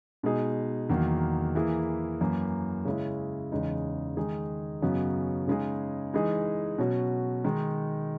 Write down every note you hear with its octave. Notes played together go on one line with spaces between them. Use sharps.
B2 G#3 D#4 G#4
E2 D#3 F#3 A#3
E3 A#3 E4 G#4
F#2 E3 A#3
C#3 G#3 C#4 E4
E2 C#3 G#3 D#4
D#3 G#3 D#4 G#4
F#2 C#3 F#3 B3 D#4
C#3 G#3 D#4 G#4
E3 G#3 D#4 G#4
B2 F#3 C#4 F#4
D#3 G#3 D#4